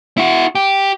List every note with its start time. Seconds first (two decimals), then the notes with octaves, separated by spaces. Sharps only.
0.17 E4 F#4
0.55 G4